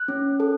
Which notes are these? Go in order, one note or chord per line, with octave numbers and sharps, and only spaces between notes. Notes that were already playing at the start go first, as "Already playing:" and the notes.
Already playing: F#6
C#4
A4